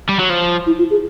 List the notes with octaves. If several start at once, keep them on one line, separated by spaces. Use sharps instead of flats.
G3
F#3
F3
E4
F4
G#4